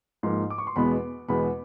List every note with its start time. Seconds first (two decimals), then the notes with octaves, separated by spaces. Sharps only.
0.23 G#2 F3 A#3 C6
0.50 D6
0.58 C#6
0.67 C6
0.76 E2 B2 G#3 B3 B5
1.28 E2 B2 G#3 B3 B5